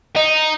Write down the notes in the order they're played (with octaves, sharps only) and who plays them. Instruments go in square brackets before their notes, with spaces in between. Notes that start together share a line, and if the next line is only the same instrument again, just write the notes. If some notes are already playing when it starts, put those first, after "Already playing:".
[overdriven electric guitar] D#4